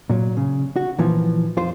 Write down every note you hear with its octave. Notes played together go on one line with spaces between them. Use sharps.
A#2 F#3
C#3
F#4
A#2 E3 F3
F2 F4 C5